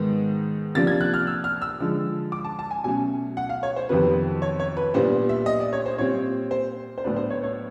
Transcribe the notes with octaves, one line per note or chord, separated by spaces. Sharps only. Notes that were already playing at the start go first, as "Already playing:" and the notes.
Already playing: G#2 D#3 G#3 B3
C3 F3 A#3 D4 A6
G#6
F#6
F6
E6
F6
E6
D3 F3 G#3
D6
A5
A5
G#5
B2 F#3 A3 C#4 G#5
F#5
F5
C#5
C5
F2 C3 D#3 F#3 B3 B4
C#5
C#5
B4
A#2 G3 B3 D4 C5
E5
D#5
D5
C#5
C5
A#2 G3 C4 C#5
C5
C5
A2 F#3 B3 D4 B4
C5
C#5
C#5